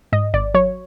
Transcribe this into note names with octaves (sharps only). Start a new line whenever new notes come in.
G#2 D#5
G#1 D5
F#3 C#5